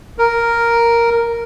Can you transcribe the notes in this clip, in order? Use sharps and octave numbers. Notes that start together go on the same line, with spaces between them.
A#4